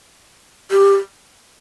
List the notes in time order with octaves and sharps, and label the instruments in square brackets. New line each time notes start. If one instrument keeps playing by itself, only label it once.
[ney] G4